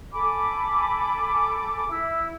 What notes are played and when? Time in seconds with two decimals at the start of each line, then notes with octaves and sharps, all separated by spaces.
0.13 A4 G#5 B5 D6
1.89 E4 E6